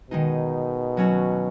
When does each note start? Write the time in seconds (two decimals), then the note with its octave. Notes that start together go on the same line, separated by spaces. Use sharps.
0.10 B2 D#3 G#3 D#4
0.97 F#3 C#4 F#4